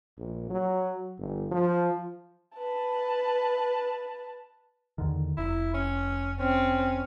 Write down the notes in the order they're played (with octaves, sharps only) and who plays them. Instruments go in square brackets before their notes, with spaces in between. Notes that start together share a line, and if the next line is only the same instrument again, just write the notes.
[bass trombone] A#1
F#3
G1
F3
[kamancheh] B4 A5
[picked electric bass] E2 D3 D#3
[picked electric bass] F1 [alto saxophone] E4
[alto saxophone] C#4
[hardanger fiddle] C4 [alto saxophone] C#4